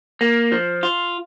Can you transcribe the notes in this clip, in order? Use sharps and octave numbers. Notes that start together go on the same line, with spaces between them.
A#3
F3
F4